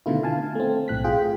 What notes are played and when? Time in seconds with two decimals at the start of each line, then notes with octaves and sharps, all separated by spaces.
0.06 B2 D3 D#3 A3 E4 F4
0.23 F5 G#5 A5
0.55 A3 C4
0.88 B1 A2 F#6 B6
1.04 F4 G#4 G5